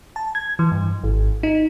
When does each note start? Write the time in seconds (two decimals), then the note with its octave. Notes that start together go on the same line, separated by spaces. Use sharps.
0.16 A5
0.35 G#6
0.59 E3
0.72 G2
1.04 G#1
1.43 D#4